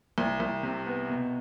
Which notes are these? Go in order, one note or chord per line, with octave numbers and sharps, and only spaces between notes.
C2
C2
C3
B3
B2